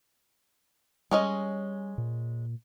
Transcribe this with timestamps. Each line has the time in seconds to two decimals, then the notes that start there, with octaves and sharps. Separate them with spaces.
1.11 G3 G#3 C#4 D#5
1.98 A#2